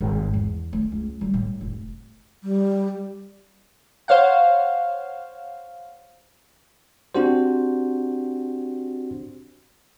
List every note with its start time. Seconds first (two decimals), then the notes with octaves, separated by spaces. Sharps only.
0.01 G#1
0.34 E2
0.73 A3
0.92 C#2
1.21 G3
1.34 A2
1.61 F1
2.44 G3
4.08 C5 C#5 F5 F#5
7.15 C4 D4 F#4 G4 C5